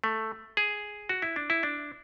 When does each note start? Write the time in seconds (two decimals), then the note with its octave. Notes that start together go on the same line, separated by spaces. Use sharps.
0.04 A3
0.57 G#4
1.09 F#4
1.22 E4
1.36 D4
1.50 E4
1.63 D4